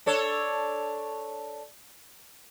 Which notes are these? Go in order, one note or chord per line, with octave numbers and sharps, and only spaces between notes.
D4 A4 C#5